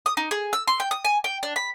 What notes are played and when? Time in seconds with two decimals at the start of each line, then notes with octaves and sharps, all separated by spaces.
0.06 D#6
0.17 D#4
0.31 G#4
0.53 E6
0.67 C6
0.80 G5
0.91 D#6
1.05 G#5
1.24 G5
1.43 D4
1.56 B5